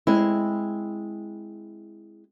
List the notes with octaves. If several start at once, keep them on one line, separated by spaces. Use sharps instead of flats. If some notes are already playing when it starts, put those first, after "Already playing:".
G#3 C4 E4